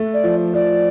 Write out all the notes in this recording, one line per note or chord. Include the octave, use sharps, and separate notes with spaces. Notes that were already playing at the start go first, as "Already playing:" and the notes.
Already playing: A3
D5
F3
F3 D5